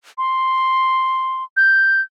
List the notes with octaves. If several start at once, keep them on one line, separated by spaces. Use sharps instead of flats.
C6
G6